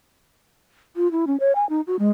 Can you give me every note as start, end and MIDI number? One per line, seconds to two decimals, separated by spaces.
0.97 1.11 65
1.12 1.25 64
1.27 1.37 61
1.40 1.52 73
1.55 1.68 80
1.69 1.81 63
1.87 1.99 66
1.99 2.09 56